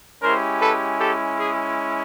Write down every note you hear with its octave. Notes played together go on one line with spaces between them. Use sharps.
G#3 C#4 E4 G4 A#4 C5
A4 B4
G4 A4
G#4